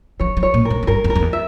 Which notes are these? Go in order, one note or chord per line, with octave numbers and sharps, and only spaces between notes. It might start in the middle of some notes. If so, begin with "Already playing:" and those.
F3 C#5
F3
C#5
A#2
A#4
G#2
F2
G2 A#4
F2
A#4
F2
E2
E5